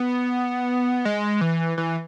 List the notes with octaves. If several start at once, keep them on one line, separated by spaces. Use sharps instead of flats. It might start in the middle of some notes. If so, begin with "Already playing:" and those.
Already playing: B3
G#3
E3
E3